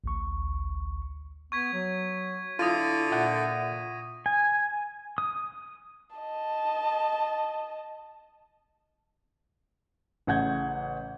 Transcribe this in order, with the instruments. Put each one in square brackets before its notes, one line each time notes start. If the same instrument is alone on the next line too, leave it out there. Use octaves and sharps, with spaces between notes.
[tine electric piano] A1 D2 C#6
[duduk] B3 [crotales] C#6 G#6 B6
[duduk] F#3
[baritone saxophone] D3 [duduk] E4 [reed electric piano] F4 [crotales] D#6 A#6 D#7
[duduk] A#2 [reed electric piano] E5 F#5 G6
[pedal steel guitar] G#5
D#6
[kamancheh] D#5 A5
[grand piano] A1 C#3 F#5 G6 G#6